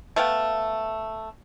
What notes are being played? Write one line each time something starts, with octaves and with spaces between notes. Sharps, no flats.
A3 B3 F5 G5